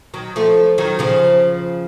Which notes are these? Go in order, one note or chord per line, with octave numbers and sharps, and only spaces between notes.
D#3 F#3
F3 A3
D#3 F#3
C#3 F3